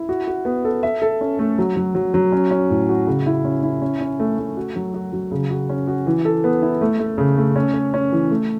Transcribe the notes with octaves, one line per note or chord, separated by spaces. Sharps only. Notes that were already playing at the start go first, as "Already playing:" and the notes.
Already playing: E4
F#4
F#4
B3
A4
E5
A4
C#4
A3
F#3
F#3
F#3
F#3
C#4
C#4
A2
F#4
C#3
E4
C#4
E4
C#4
C#4
A3
A3
F#4
F#3
F#4
F#3
C#3
F#4
C#4
F#4
E3
A4
B3
E4
A3
A3
C#3
A3
C#4
C#5
C#4
E3
A3